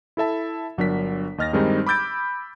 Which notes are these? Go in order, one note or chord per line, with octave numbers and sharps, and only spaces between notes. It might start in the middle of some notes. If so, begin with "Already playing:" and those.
E4 A4 E5 A5
G1 F#3 D4 A#4 B6
D#2 D#5 F6 A6 A#6
G2 D#3 G3 G#3 C4 D#4
B5 D6 E6 G6 A6 D7